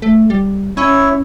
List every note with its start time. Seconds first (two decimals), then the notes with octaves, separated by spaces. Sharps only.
0.02 A3
0.30 G3
0.77 C#4 E4 C#5